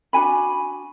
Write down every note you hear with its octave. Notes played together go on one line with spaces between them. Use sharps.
D4 F#4 G#5 B5